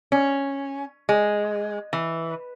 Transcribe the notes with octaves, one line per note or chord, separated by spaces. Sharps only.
C#4
G#3
E3